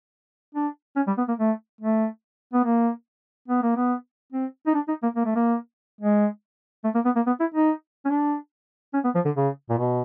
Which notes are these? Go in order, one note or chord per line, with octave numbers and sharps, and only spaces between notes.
D4
C#4
G3
B3
A#3
A3
A3
B3
A#3
B3
A#3
B3
C4
D#4
D4
D#4
A#3
A#3
A3
A#3
G#3
A3
A#3
B3
A#3
B3
E4
D#4
C#4
D4
C#4
B3
F3
D3
C#3
A#2
B2